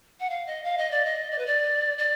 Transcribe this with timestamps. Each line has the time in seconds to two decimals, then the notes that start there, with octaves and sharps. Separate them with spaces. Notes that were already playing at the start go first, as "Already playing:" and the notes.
0.20 F#5
0.30 F5
0.46 D#5
0.64 F5
0.78 D#5
0.91 D5
1.05 D#5
1.31 D5
1.38 B4
1.46 D5
1.98 D5